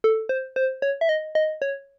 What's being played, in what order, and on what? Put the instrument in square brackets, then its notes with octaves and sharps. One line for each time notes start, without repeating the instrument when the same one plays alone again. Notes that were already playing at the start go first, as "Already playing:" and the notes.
[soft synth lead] A4
C5
C5
C#5
E5
D#5
D#5
C#5